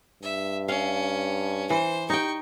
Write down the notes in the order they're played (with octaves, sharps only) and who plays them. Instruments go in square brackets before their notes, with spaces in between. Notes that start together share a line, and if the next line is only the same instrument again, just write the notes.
[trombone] G2 [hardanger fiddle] E5
[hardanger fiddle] C#4 [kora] F5
[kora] E3 [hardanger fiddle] C5
[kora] D#4 G5 [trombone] G4 [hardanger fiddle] C#6